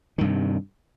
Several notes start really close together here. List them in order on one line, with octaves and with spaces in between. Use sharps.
D#3 G2 C3